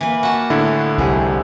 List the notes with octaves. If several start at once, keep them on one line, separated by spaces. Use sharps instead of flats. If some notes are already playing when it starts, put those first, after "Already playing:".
E3 A#3 B4
F#4 A5
A2 D3 E4
C2 G#3 G4